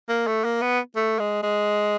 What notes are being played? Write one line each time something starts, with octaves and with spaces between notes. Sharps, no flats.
A#3
A3
A#3
B3
A3
G#3
G#3